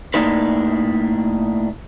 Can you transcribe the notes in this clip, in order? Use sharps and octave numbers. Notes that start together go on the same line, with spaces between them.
A2 A#3 D4 D#4 B4